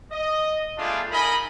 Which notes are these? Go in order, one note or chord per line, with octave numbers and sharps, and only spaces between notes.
D#5
G3 A3 B3 D4 F4 G#4
D#4 A#4 D#5 G#5 B5